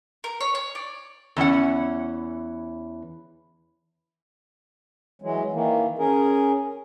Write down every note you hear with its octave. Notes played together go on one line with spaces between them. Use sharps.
A#4
C#5
C#5
D5
E2 E3 C#4 F#5
E3 F#3 G#3
D#3 E3 A#3
C#4 G#4 A#4